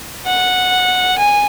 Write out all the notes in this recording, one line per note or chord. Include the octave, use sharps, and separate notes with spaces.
F#5
G#5